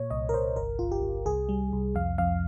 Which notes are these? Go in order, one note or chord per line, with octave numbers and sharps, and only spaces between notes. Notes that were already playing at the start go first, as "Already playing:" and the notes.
Already playing: A#2 C#5
C2 D#5
A#4
C2 C5
G1 A#4
G1 F4
G4
G1
C2 G#4
G3
C2
F2 F5
F2 F5